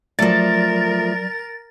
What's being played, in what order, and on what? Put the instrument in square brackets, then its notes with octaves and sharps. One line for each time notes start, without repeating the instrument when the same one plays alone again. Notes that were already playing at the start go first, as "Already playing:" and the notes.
[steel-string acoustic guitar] F3 A3 [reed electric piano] F#3 D5 [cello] A#4 [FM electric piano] A6